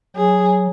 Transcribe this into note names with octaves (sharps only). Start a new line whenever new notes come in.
F#3 G#4